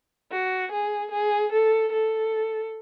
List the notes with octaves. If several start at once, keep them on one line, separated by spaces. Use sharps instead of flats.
F#4
G#4
G#4
A4
A4